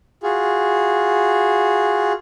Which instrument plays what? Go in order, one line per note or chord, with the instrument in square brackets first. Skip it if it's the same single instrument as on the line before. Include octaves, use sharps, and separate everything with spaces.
[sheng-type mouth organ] F4 F#4 G#4